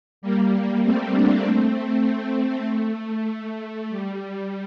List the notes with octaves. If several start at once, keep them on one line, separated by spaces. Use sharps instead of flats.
G3 A#3
A3 C4
A#3 D4
A3 C4
A3
G3